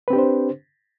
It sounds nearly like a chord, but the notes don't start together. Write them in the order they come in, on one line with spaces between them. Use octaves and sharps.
B4 C4 G4 D4 C5